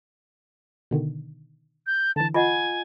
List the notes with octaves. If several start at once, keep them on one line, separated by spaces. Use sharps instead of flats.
B2 D3 D#3
G6
D3 E3 A5
F4 D#5 F#5 G#5